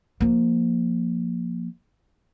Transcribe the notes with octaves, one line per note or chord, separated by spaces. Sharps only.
F3 A#3